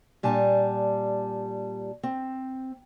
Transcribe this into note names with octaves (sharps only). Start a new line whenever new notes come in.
A#2 G3 D4 G#5 A5
C4